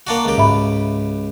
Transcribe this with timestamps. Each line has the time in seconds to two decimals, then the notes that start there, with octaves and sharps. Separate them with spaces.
0.07 A#3 D4 F#4
0.25 C#2 G4
0.37 G#2 E5 B5